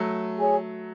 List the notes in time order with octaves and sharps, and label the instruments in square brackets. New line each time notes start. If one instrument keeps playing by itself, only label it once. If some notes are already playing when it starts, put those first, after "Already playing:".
Already playing: [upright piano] F#3 A3
[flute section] G#4 C#5 G#5